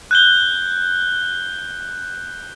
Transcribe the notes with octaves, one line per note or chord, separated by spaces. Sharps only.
F#6 G6 G7